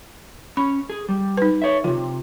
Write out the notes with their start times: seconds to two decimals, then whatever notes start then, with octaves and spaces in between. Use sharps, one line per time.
0.57 C#4 B5
0.90 G#4
1.09 G3
1.37 D#4 B4
1.62 C#5 E5
1.84 C3 D#3 F4